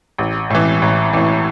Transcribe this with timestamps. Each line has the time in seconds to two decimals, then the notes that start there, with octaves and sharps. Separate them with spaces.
0.18 A1
0.50 A2 E3
0.82 A1
1.13 A2 E3